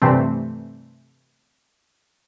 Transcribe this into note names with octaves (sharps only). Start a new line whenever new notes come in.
G2 C3 E3 A3 C4